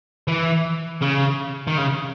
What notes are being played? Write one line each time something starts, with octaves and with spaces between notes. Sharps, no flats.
E3
C#3
D#3
C#3